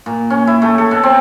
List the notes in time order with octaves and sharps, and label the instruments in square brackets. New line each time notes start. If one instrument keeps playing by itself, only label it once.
[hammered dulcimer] A#2
C#4
E4
A3
A4
B2
C4